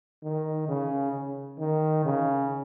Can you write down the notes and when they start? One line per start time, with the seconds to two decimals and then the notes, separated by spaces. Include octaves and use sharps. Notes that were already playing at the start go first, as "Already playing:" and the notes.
0.24 D#3
0.69 C#3
1.60 D#3
2.05 C#3